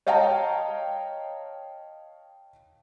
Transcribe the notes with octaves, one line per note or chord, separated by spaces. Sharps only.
C#5 D#5 F5 G5 A5 A#5